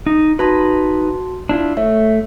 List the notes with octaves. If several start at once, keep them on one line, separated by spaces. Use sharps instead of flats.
D#4
D#4 F#4 B4 A5 C6
D4 E4 F4
A3 C#5 E5